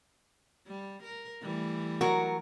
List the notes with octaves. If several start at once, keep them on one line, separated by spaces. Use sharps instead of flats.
G3
A#4
E3 G3 A3
F#3 F#4 A#4